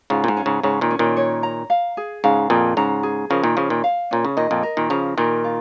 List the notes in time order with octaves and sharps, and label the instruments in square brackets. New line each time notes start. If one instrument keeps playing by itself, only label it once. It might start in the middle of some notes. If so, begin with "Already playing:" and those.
[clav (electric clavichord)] G#2 C#3 [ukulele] F4
[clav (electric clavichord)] A#2
G#2
[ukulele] C#4
[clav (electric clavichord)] G#2 C#3
[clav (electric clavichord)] G#2 C#3 [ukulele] C#5
[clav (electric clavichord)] A#2 D#3
[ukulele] C#4
[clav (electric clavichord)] A#2 D#3
[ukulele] C#5
A#5
F5
G#4
[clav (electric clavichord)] G#2 C#3 [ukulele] F5
[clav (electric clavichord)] F2 A#2 [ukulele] G#4
[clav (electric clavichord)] G#2 C#3 [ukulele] A#5
[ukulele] G#4
[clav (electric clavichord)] C#3 F3 [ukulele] A#4
[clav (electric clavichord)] A#2 D#3
[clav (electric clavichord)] C#3 F3 [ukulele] C#4
[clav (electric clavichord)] A#2 D#3
[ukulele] F5
[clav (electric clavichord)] A#2 [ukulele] C#4
[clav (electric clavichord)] C#3
[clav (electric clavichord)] A#2 D#3 [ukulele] D#5
[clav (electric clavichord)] F2 A#2
[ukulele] A#4
[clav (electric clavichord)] A#2 D#3
[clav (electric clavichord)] C#3 F3 [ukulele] A#5
[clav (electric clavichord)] A#2 D#3 [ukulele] A#4
[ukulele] F4